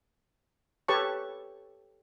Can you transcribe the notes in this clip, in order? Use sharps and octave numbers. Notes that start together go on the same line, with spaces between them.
G4 A4 B4 C#5 A5 C#6